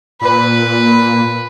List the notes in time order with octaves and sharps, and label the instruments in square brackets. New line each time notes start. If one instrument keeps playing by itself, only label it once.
[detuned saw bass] A#2 [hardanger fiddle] B4